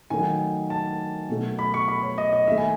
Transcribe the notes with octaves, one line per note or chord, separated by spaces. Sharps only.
D#3 F#3 A3 G#5
A5
B2 F#3 A3
B5
C#6
B5
C#5
D#5
D#5
D#3 A3 E5
G#5